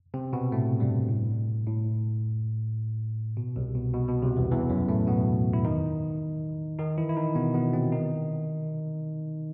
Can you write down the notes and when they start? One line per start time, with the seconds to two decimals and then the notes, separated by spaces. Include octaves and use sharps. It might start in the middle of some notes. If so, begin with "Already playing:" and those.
0.14 C3 C4
0.33 B2 B3
0.52 A2 A3
0.80 G2 G3
1.09 A2
1.66 A2
3.37 B2
3.56 C2 C3
3.75 B2
3.94 B2
4.08 B2
4.22 C2 C3
4.37 E2 E3
4.51 E2 E3
4.70 F#2 F#3
4.89 A2 A3
5.07 B2 B3
5.53 E4
5.65 D#3 D#4
6.79 D#3 D#4
6.98 E3 E4
7.09 E4
7.17 D#3 D#4
7.35 B2 B3
7.54 B2 B3
7.73 C3 C4
7.92 D#3 D#4